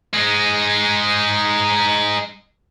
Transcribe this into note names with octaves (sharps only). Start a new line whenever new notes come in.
G#3 D#4